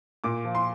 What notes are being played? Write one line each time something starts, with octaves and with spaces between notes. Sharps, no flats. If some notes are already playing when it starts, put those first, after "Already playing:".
A#2 D6
F3
C6